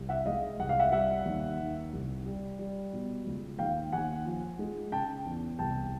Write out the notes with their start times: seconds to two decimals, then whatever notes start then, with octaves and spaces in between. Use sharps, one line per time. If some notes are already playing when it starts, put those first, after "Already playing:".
Already playing: C2
0.09 E5 F#5
0.25 G#3 D#5 F5
0.59 C2 F#5
0.69 F5
0.79 E5 F#5
0.92 G3 E5 F#5
1.25 D#2
1.59 D#3
1.93 C2
2.26 G3
2.59 G3
2.93 B2
3.26 C#2
3.59 D#2 F5 G5
3.92 D#2 F#5 G#5
4.25 F3
4.59 G#3
4.92 C#3 G5 A5
5.25 E2
5.59 C2 G5 A5